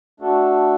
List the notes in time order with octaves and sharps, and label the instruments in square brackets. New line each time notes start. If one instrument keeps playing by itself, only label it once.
[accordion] A3 D4 F#4 A4